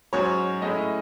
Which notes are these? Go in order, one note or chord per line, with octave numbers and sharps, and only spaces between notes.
G#2 F#3 C#4 F#4 C5 C#5
A2 G#3 C#4 E4 D#5